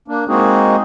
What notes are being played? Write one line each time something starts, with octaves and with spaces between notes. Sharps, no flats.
A#3 D4
G#3 A#3 C4 D#4 F#4 G#4